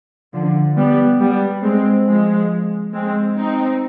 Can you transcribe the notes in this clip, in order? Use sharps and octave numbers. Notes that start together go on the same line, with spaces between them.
D3 F3
G3 B3
G3 B3
G#3 C4
F3 G#3
G#3 C4
C4 D#4